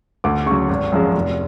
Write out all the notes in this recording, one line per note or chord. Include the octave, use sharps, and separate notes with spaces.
D2 D6
C#3 F#3 C#6
G#1
F#2 F3 G#3
F1